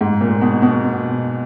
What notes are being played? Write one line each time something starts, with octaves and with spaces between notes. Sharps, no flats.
G#2
A#2
B2
B2